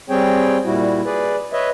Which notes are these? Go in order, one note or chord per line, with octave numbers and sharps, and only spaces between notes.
G3 C4 G#4 C#5 G5
A#2 G3 E4 F#4
G#4 B4 D5
B4 C#5 D#5 E5